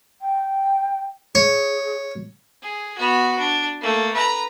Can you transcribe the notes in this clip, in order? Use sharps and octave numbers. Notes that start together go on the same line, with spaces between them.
G5
G#4 C#5
G#4
B3 F#4
D4
A3 A#3
B4 A#5